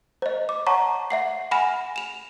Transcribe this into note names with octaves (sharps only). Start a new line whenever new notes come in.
C5 D#5
D6
C#5 F#5 A5 A#5 C#6
E5 F#5 C7
F#5 G#5 B5 F6 A#6 E7
E7 F7